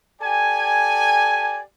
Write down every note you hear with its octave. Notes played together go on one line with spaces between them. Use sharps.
G4 A4 D5 G#5